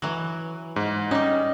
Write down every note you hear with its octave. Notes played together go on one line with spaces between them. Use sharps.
E3 F#3
G#2
G3 C#4 D#4